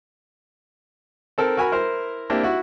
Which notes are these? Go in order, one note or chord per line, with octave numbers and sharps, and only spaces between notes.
C4 A4 A#4
F#4 A#4 G#5 B5 F6
E4 A#4 C5
A#3 C4 D4 E4 G4
E4 F#4